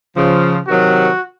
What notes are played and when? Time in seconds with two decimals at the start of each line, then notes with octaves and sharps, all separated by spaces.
0.16 C#3 F3
0.67 C3 D#3 F#3 F#4